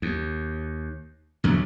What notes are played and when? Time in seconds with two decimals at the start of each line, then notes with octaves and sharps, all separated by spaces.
0.02 D#2
1.44 A#1 E2 D3 F#3